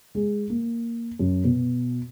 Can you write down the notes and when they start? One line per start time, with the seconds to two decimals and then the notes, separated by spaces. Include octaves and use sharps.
0.15 G#3
0.50 A#3
1.19 F#2
1.44 B2